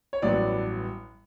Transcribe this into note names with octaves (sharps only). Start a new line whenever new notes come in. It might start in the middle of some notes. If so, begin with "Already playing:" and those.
C#5
A1 G2 F#3 B3 D5